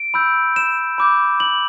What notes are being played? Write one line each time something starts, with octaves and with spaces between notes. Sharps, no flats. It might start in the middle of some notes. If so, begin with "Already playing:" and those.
Already playing: D7
B5 E6 G6
E7
B5 D6 G6
F#7